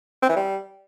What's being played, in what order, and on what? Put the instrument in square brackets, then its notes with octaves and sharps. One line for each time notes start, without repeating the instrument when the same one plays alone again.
[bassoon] C4
E3
G3